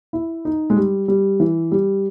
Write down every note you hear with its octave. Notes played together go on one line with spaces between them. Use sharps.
E4
D#4
G#3
G3
G3
E3
G3